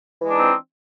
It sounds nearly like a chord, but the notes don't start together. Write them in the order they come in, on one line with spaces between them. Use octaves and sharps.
E3 G#3 D4 D#4 C4